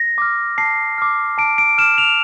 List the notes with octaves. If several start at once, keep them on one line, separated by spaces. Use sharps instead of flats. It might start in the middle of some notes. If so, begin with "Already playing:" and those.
Already playing: A#6
D6 F6
A5 C7
D6 F6
A5 D7
D7
D6 F6 E7
F7